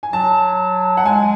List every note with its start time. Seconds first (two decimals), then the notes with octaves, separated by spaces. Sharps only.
0.03 G#5
0.12 F#3 A5
0.97 F#5
1.05 G#3 G#5